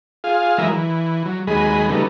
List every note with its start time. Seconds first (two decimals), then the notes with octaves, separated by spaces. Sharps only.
0.24 F4 G#4 F5
0.58 E3 F#3 G#3 A#4 D#5 E5
0.73 E3
1.25 F#3
1.47 D#2 F#3 G#3 G#4 D#5 B5
1.89 C#3 F#3 G3 A3 B3 D#4